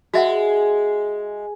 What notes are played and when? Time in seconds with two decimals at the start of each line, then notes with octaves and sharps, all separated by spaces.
0.14 G#3 F#4 E5 F#5